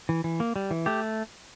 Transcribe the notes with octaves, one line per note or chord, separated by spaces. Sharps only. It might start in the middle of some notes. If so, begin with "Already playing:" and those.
E3
E3
A#3
G3
E3
A3 G4